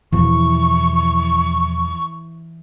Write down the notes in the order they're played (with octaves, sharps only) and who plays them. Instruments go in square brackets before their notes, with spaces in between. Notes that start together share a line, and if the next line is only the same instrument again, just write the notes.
[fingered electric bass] E2 B2 F3 [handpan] E3 [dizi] C#6